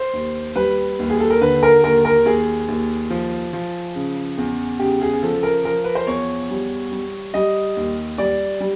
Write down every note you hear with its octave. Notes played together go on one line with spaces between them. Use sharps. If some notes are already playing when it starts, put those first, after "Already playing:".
Already playing: C5
D#2
G3 B4
D#2
G#4
A4
A#4
D3 B4
A#4
D#2 A#4
A#4
D#2 G#4
D#2
F3
F3
C#3
E2
C#3 G4
G#4
G#4
F3 A4
A#4
F3 A#4
B4
C5
E2 C#5
G3
G3
G3 D#5
D#2
G3 D5
G3